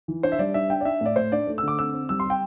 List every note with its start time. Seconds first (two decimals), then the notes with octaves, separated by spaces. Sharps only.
0.08 E3
0.23 D4 C5
0.32 E5
0.39 G3 D5
0.54 D4 E5
0.70 D4 G5
0.81 D5
0.85 D4 E5
1.01 A2 D5
1.16 A2 C5
1.32 D4 D5
1.47 A3
1.58 D3 E6
1.68 D6
1.78 C4 E6
1.94 C4
2.09 G3 E6
2.20 C6
2.25 G3
2.30 G5